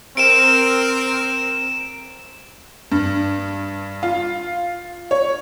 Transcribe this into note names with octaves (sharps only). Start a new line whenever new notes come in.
C4 A#4 D7 E7
G2
F4
C#5